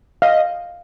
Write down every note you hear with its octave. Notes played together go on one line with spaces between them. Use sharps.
D#5 F5